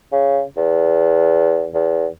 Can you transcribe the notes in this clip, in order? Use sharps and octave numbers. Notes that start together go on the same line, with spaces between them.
C#3
E2
E2